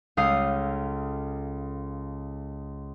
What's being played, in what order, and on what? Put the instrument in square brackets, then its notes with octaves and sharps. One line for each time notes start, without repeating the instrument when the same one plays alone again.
[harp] C#2 A4 F5 D#6 G6 C7